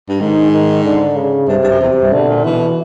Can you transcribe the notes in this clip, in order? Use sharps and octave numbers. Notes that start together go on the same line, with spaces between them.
G2
G#2 D#3
D#3
D3
C#3
G2 C3
G2
F#2
E2 C3
G2
B2 D3
A#2
B2 E3